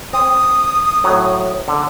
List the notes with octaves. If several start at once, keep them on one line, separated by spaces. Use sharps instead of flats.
C4 D#6
A2 F#3
D3